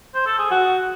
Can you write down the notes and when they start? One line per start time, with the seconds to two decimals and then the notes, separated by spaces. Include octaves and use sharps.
0.14 C5
0.26 A4
0.39 G#4
0.51 F#4